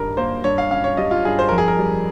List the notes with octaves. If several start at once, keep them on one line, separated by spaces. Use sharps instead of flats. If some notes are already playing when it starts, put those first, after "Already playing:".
Already playing: G#1 G2 G3 A#4
A#3 C5
G2 C#5
F5
C#4 F5
C#5
G3 D#5
F4
G2 G#4
C5
F2 A#4
G#4
A#4
G3